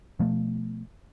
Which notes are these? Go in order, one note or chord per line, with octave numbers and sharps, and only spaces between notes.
B2 F3 A3